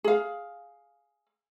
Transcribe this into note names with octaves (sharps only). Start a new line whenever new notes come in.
G#4 F5